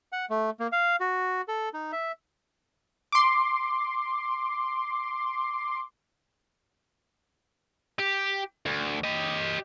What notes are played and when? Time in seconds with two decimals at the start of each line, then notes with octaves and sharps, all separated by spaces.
0.12 F#5
0.30 A3
0.60 A#3
0.72 F5
1.00 F#4
1.48 A4
1.74 D#4
1.92 E5
3.12 C6 D6
7.99 G4
8.66 D2
9.04 G4 D#5